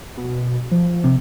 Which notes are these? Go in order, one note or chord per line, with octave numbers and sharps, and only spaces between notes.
B2
F3
C3